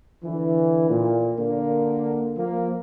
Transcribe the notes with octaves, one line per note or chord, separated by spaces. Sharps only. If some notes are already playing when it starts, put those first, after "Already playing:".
D3 E3
A#2
D3 A#3
F3 A#3